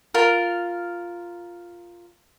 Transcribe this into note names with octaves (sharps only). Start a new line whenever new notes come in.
F4 A#4